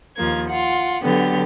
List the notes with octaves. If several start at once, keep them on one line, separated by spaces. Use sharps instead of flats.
D#2 F3 A#3 G#6
F4 F#5
D3 F#3 B3 G4 A4